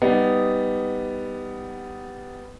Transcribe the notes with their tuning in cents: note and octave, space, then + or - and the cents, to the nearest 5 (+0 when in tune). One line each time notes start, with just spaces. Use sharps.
G3 +5 B3 +10 D#4 +0